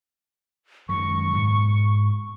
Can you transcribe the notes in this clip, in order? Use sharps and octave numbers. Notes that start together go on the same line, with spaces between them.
F#2 D#3 G#3 C#6
G#2 B2